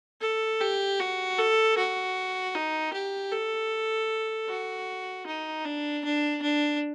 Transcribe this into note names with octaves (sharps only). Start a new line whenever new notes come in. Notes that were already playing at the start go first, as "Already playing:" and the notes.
A4
G4
F#4
A4
F#4
D#4
G4
A4
F#4
D#4
D4
D4
D4